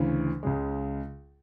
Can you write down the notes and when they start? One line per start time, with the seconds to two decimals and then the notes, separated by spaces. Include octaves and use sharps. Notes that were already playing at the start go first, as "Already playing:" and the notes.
Already playing: D2 C#3 E3
0.43 C#2 C#3 G#3